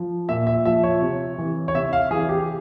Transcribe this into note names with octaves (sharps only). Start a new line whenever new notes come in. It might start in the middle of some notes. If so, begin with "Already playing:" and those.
Already playing: F3
A#2 E5
E5
F3 E5
C#5
C3
E3
C#5
C3 E5
F5
E3 G#4
G4